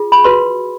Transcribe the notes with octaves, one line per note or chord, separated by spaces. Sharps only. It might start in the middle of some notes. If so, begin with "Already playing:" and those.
Already playing: F4 G#4
B5
F#4 B4 C6